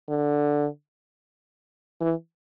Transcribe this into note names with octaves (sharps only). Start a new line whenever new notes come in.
D3
E3